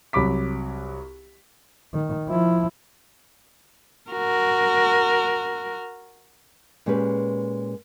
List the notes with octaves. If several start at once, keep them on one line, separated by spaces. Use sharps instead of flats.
C2 F#3 B5 D6 B6
D#3
F3 E4
F#4 A#4
A#2 G#3 C#4 G4 B4